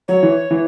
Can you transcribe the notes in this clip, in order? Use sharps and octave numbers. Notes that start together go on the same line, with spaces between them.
F#3 C#5
E3
E3